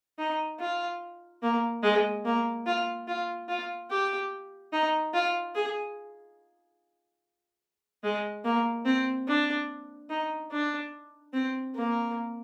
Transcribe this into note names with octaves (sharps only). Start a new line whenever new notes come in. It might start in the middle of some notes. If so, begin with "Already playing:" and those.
D#4
F4
A#3
G#3
A#3
F4
F4
F4
G4
D#4
F4
G#4
G#3
A#3
C4
D4
D#4
D4
C4
A#3